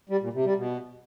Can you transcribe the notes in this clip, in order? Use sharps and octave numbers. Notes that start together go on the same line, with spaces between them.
G3
A#2
C3
G3
B2